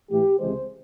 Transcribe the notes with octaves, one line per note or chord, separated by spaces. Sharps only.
A2 E3 A3 G4
C#2 C3 E3 G#3 C5